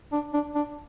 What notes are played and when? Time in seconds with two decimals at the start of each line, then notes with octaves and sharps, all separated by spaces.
0.13 D4
0.34 D4
0.55 D4